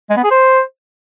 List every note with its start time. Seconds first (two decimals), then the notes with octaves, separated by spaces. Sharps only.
0.10 G#3
0.17 B3
0.24 G#4
0.31 C5